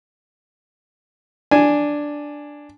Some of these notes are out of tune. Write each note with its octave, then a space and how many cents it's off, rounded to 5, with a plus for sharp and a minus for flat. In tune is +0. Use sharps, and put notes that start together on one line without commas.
D4 +0 G#5 +0